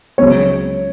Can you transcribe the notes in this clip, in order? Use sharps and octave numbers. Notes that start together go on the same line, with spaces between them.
C#2 C#3 F#3 C#5